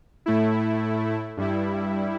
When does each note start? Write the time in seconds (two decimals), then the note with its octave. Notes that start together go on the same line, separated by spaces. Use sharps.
0.26 A2 A3 E4
1.37 G2 G3 E4